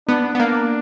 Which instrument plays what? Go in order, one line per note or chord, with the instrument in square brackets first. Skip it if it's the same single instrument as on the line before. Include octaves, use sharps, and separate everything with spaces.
[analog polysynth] B3 [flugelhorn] D4
[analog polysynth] B3
A#3